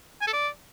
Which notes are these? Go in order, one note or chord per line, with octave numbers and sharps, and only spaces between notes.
G#5
A4
D5